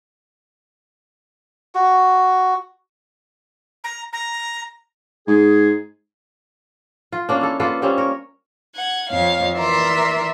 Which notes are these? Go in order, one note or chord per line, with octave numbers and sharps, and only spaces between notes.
F#4
A#5
A#5
G#2 G#4
F4
A#3 C#4 D4
E4 A4
A#3 F4 A4 B4
G3 A#3 C4 C#4
A#4 C#5
F#5 G#6
F2 C#5 F5
E3 A#4 D5 E5 A#5 C6